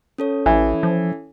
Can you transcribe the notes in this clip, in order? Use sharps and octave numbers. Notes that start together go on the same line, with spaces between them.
C#4 A4 C#5
A1 E3
F3